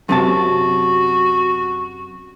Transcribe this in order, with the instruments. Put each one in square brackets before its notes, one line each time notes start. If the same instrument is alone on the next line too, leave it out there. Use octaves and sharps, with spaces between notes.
[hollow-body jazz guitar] F#2 C3 A5 [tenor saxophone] F#4